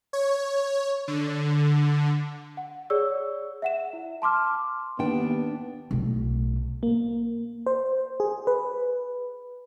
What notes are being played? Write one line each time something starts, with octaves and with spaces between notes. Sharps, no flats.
C#5
D3
F#5
G#4 C#5 D5 E6
E5 F#5 E7
E4
A5 C6 D6 F6
D#2 B3 D4 G5
B1 A2
A#3
C5
G#4
B4